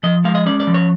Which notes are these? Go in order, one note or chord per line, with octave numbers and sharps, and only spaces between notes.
F3 D#5
G#3 F5
D#5
C#4 D5
D5
F3
C#5